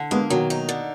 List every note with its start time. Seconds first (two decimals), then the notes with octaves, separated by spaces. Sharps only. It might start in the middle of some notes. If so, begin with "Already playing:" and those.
Already playing: D3
0.11 G#3 A#3 B3
0.30 B2 D#3 F#3
0.50 D#4
0.69 D3